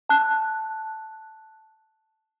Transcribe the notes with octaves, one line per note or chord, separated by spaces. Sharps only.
A5 F#6